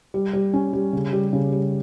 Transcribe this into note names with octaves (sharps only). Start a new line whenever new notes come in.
G3
G3
C#4
G3
C#3
G3
C#3
G3